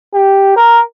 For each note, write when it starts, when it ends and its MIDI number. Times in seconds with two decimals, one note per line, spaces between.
0.15 0.56 67
0.56 0.80 70